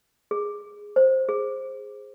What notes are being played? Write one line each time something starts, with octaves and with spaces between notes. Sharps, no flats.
G#4
C5
G#4